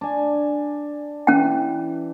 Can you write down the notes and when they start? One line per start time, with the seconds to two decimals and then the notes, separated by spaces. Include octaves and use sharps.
0.01 D4 G#5
1.27 E3 C#4 G5